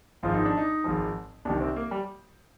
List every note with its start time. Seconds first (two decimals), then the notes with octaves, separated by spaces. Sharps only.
0.23 G#1 G#2 F3 F4
0.34 D#4
0.45 D4
0.57 D#4
0.84 G#1 G#2 F3
1.45 C2 C3 D#3 D4
1.60 C4
1.76 A#3
1.91 G3